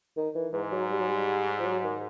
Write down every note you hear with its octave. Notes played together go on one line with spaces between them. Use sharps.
D#3
E3
G#2 E3
F#3
G3
F#3
G3
F3
F#3
D#3